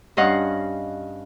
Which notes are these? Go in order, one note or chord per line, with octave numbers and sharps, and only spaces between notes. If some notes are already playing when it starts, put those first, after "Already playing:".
G2 C#4 D#5 F5 F#5